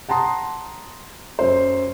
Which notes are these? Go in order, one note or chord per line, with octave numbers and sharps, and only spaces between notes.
F#5 A5 A#5 C6 D#6
F#2 C5